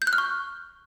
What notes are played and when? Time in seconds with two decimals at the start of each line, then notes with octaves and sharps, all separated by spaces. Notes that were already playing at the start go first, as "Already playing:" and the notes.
0.02 G6
0.07 F#6
0.13 F6
0.18 C#6